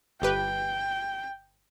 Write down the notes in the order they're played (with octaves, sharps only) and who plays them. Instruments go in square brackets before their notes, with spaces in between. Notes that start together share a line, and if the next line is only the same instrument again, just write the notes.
[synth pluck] G1 G4 B4 [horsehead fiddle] G5